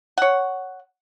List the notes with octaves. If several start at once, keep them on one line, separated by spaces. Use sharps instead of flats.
C#5 F#5